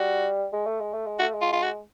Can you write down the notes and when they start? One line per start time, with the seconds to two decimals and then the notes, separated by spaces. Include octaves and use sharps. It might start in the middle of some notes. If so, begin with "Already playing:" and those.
Already playing: G3 F#4
0.53 G#3
0.66 A3
0.80 G#3
0.93 A3
1.06 G#3
1.19 A3 F#4
1.34 G#3
1.42 F4
1.53 F4
1.63 F#4